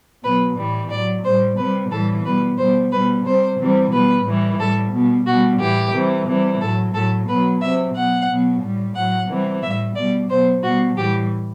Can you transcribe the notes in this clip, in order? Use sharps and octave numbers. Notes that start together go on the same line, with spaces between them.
B2 F#3 B4
A2 E3 G3
A2 F#3 D5
A2 G3 C5
C3 G3 B4
A2 E3 G3 A4
B2 G3 B4
B2 G3 C5
B2 G3 B4
C3 G3 C5
C3 E3 G3
B2 G3 B4
A2 E3 G3
A2 G3 A4
B2 G3
B2 G3 F#4
A2 E3 G3 G4
C3 E3 G3
C3 E3 G3
A2 F#3 A4
A2 F#3 A4
B2 F#3 B4
C3 F#3 E5
B2 F#3 F#5
B2 F#3
A2 G3
A2 F#3 F#5
C3 E3 G3
A2 G3 E5
B2 G3 D5
B2 F#3 C5
B2 G3 F#4
A2 E3 G3 G4